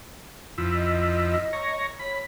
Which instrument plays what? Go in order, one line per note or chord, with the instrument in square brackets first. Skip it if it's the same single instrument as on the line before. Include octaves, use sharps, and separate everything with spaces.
[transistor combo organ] F2 E4
[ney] D#5
[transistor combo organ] C#5 A#5
[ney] C#5 [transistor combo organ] B5